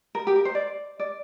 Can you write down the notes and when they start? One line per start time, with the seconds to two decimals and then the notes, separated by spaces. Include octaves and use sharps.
0.15 A#4
0.27 G4
0.36 A#4
0.45 C5
0.55 D5
1.00 D5